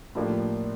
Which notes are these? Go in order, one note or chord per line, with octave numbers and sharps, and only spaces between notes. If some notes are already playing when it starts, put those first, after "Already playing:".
A2 F3 A#3 D4 G4